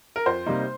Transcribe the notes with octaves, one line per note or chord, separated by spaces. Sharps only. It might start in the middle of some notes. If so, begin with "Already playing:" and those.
A#4
F2 C5
C3 G3 A#3 D#4